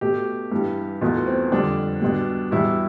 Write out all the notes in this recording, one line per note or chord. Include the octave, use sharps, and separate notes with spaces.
B2 A3 G4
G2 E3 G3
E2 B2 A3 F4
C4
F2 D3 G3 D4
B2 G3
E2 B2 G3 E4